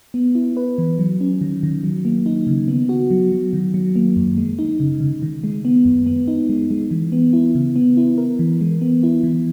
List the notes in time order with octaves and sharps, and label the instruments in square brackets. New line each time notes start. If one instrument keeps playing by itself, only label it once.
[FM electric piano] B3
E4
B4
E3
F#3
C#4
D#3
D#3
F#3
A#3
D#4
C#3
B3
F#4
F#3
F#3
D#3
F#3
A#3
F#2
G#3
D#4
C#3
C#3
D#3
G#3
B3
F#2
B3
D#4
G#3
G#3
E3
B3
E4
C#3
B3
E4
A#4
E3
G#3
B3
E4
E3